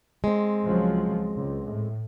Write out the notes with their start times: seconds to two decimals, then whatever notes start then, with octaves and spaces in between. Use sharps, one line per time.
0.24 G#3 C4
0.64 C#2 F3 F#3
1.37 C#2
1.68 A2